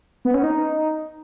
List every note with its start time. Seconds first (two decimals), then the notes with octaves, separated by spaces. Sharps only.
0.25 B3
0.34 C#4
0.43 D#4